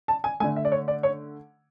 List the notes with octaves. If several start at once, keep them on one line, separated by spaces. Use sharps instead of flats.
A5
G#5
D3 A3 G#5
E5
D5
C#5
D5
C#5